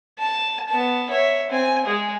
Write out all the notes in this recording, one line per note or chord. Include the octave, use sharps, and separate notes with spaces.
A5
B3 A5
C#5 E5
C4 G#5
G#3 G#4